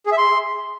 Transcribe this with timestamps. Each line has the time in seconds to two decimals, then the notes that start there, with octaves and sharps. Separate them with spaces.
0.06 G#4
0.12 E5
0.18 C6